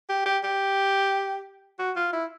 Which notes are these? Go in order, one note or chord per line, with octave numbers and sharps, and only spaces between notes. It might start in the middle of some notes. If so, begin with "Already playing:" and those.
G4
G4
G4
F#4
F4
E4